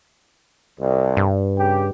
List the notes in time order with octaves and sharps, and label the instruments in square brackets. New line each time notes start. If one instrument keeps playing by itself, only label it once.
[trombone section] C2
[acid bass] G2
[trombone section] C#3 G4